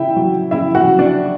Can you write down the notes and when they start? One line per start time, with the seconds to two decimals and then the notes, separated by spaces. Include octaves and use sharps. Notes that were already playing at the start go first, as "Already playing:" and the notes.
Already playing: C#3 E4 E5 G5
0.17 F#3
0.51 C#3 E4 E5
0.75 F#4 F#5
0.88 F#3
0.99 D4 D5